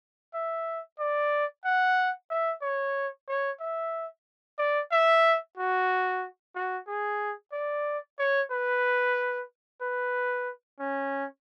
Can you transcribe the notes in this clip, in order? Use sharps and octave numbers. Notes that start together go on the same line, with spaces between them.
E5
D5
F#5
E5
C#5
C#5
E5
D5
E5
F#4
F#4
G#4
D5
C#5
B4
B4
C#4